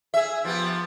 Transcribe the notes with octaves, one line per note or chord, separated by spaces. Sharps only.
G#4 E5
F3 B3 G4